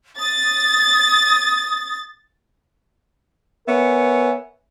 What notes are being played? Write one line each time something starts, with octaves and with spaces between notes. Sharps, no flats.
D#6 A6
B3 A#4 C#5 E5 G#5